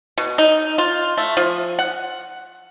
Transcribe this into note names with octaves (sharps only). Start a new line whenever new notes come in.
B2
D#4
F4
A3
F3
F#5